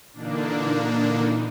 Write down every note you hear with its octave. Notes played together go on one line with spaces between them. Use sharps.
A#2 D3 E3 A#3 D4 D#4